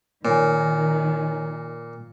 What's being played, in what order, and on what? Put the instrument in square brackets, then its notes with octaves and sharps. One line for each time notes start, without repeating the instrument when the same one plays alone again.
[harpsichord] A#2 [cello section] D#3 [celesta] C#5 G#5